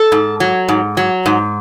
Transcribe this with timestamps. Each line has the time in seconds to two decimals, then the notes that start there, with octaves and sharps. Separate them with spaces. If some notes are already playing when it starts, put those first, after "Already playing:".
Already playing: A4
0.12 G#2
0.40 F#3
0.68 G#2
0.97 F#3
1.26 G#2